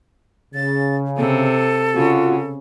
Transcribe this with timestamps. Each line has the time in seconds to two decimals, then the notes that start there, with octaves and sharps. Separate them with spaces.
0.54 C#3 A6
1.17 C3 A4
1.95 C#3 F4 F#4